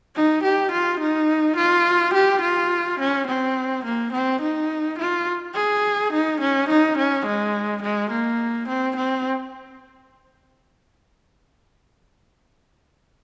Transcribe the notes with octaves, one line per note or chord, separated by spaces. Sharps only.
D#4
G4
F4
D#4
F4
G4
F4
C#4
C4
A#3
C4
D#4
F4
G#4
D#4
C#4
D#4
C#4
G#3
G#3
A#3
C4
C4